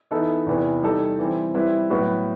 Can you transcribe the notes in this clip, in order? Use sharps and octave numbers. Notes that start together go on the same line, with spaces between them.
E3 B3 D#4 A4 E5
E2 C3 E3 B3
G3 D#4 A4
E3 G3 C4
G3 C4 E4 B4 E5
A2 F#3 B3 F#4 B4